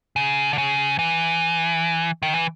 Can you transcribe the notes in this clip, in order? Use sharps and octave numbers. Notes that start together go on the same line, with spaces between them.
C#3
D3
C#3
E3
D#3
E3